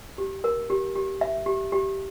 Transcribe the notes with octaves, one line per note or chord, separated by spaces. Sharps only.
G4
A#4
G4
G4
E5
G4
G4